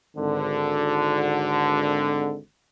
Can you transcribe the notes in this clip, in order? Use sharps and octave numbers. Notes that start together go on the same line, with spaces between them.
G#1 D3